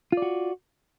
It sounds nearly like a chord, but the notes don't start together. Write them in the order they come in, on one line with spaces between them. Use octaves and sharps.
F4 D5 F#4